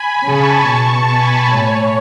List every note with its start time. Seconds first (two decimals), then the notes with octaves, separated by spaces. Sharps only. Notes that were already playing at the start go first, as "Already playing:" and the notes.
Already playing: G#5 B5
0.23 C#3 A5 C#6
0.65 B2
1.07 G#5 B5
1.49 A2 C#5